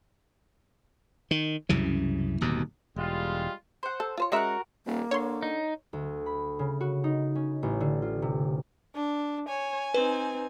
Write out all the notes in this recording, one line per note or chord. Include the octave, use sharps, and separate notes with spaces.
D#3
C2 F#2 C#3 E3
D1 D#2 B2
E1 G3 G#3 F4
C5 F#5
A4
F4 C5 C#5
G#3 C#4 F#4 A#4 E5 F#5
D#1 A#3
D3 C#5 C6
D#4
D2
B5
C#3
F#4
D#4
C#4
A1
D3
F4
C3
D4
C#5 G#5
C4 D#4 B4